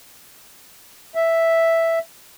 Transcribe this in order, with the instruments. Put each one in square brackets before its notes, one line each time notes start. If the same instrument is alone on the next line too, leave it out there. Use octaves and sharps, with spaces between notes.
[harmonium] E5